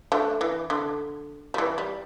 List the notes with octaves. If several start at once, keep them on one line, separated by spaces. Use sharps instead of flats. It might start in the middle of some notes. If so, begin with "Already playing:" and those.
A3 D4
E3
D3
G3
E3
G3